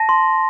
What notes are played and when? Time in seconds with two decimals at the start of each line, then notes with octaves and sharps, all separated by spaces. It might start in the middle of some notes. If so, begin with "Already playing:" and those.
Already playing: A5 A#6
0.09 C6